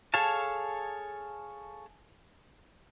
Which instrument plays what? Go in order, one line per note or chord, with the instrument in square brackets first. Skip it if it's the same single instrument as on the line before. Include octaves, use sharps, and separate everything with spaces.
[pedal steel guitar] G#4 A4 C#5 F5 A5